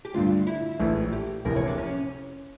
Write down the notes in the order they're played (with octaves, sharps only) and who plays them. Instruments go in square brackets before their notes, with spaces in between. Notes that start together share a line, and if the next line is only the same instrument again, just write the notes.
[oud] G4
[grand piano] G2 D3 A3 [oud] F4
[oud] E4
[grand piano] A#1 A2 E3 A3
[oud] G4
[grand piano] F1 F2 E3 A#3 [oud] A#4
[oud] C#5
D4
C#4